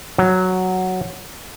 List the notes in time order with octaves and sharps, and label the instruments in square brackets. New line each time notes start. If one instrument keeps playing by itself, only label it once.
[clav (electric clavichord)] F#3